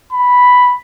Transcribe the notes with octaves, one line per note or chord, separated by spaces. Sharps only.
B5